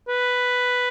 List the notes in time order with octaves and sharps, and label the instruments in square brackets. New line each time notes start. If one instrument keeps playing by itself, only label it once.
[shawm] B4